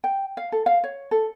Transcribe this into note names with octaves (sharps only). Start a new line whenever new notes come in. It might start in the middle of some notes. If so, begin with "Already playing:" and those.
G5
F5
A4
F5
C#5
A4